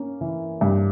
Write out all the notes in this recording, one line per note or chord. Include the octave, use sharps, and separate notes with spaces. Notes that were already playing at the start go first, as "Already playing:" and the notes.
Already playing: A#3 C#4
E3
G2